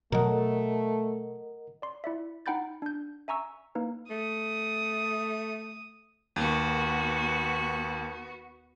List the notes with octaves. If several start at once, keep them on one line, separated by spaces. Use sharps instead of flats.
B2 F#3 A3 A#4 D#5 F#5
D5 C6
E4 D5 E5
D#4 F#5 G5 B5 G6 A6
D4 G6
E5 G#5 A#5 C#6 E6
A#3 D#4 B4
A3 D#6
D#2 B3 F#4